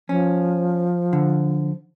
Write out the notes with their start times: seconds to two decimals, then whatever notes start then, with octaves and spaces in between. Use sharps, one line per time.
0.09 F3 C#4
1.13 D3